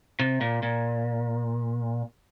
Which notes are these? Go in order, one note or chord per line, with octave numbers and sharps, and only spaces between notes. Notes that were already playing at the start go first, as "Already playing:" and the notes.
C3
A#2
A#2